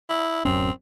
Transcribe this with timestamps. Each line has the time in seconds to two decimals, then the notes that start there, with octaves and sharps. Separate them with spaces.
0.10 E4
0.45 D1 F#2 C4 C#4